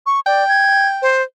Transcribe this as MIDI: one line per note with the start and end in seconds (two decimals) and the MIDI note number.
0.06 0.20 85
0.27 0.47 74
0.27 1.15 79
0.49 0.87 92
1.02 1.22 72